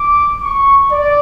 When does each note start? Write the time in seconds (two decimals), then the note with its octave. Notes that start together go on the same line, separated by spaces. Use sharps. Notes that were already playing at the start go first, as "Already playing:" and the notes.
Already playing: D6
0.42 C#6
0.92 D5